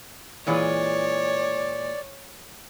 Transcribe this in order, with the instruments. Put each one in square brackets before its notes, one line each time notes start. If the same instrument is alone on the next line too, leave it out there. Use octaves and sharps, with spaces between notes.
[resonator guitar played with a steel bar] A#2 E3 G#3 [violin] C#5 [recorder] D5